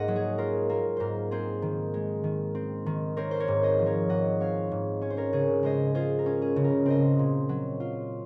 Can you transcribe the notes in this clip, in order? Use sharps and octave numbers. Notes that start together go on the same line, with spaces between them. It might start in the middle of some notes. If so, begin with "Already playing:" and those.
Already playing: G#2 A#3 A#4 C5 D#5 F#5
F#3
G#4
F4 A#4
A#3 A#4
G#2 A#4 C5
C4 G#4 C5
D#3
G#3
D#3
C4
D#3
C4 A#4 C#5
C5
A#4 C#5
G#2
C5 D#5
F3
A#4 C#5
G#2 D#5 F#5
C4 C#5 F5
G#2
C#4 C#5
C5
A#4 C#5
C#3 G#4
G#3 C5 D#5
F4 G#4 C5
A#4
C#4
G#4
C#3
A#4
C4 C5 D#5
A#2
F#3
F4